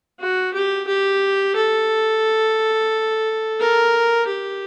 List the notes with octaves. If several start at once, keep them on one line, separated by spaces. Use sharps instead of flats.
F#4
G4
G4
A4
A#4
G4